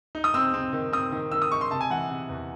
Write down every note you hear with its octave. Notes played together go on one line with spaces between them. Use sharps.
D#4
D#6
C4 E6
C4
D#3
C4 D#6
D#3
D#3 E6
D#6
D#4 C#6
C6
C3 A5
G#5
E3 F#5
C3
E2